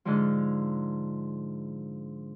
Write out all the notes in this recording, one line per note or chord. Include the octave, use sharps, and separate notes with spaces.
G#2 D3 F3